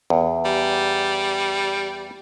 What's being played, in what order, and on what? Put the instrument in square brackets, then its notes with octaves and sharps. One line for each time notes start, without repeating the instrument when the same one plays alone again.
[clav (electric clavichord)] E2
[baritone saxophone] G3